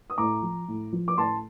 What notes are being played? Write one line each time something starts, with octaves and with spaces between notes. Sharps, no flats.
D#6
A2 A#5 D6
F3
A2
F3
D6
A2 A5 C6